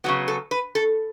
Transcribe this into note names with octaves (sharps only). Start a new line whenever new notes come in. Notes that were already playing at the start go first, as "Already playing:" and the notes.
C#3 F#3 B3 F#4
A4
B4
A4